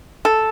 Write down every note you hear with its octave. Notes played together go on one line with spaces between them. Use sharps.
A4